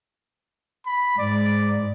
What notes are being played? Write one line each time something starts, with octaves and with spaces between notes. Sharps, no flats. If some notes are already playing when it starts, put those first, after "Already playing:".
B5
G#2 D5